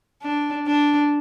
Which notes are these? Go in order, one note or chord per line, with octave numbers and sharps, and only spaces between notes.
D4
D4